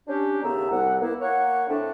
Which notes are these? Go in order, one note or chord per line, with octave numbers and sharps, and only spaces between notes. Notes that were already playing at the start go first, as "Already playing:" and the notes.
C#4 D4 G4
D#2 C#3 A3 B3 E5 A#5
C2 F#5
A#3 B3 E4
A#3 C#5 F#5
A2 A3 C4 D4